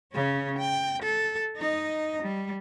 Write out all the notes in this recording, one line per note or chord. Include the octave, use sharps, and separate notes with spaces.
C#3 C#4
G5
A4
D#4 D#5
G3